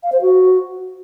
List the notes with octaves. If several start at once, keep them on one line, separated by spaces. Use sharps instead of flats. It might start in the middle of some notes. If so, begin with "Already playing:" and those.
F5
C5
F#4